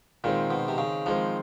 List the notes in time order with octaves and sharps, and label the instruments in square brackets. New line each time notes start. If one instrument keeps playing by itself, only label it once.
[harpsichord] A#2 [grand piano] D#3 G#3 C4
[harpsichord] B2
C3
C#3
[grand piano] D#3 G#3 C4 [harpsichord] F3